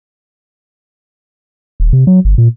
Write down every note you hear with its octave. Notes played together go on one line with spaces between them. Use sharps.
D#1
C3
F#3
G1
A#2